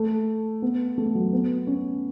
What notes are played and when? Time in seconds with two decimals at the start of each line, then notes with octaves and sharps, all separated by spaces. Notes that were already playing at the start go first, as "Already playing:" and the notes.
Already playing: A3
0.62 B3
0.98 A3
1.15 F#3
1.33 B3
1.67 C#4